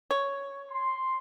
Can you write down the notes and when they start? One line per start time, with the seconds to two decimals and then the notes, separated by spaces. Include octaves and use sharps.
0.11 C#5
0.70 C6